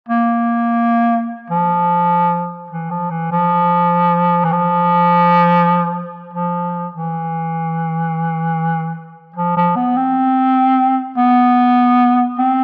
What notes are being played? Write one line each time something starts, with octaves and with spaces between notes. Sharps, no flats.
A#3
F3
E3
F3
E3
F3
E3
F3
F3
E3
F3
F3
B3
C4
B3
C4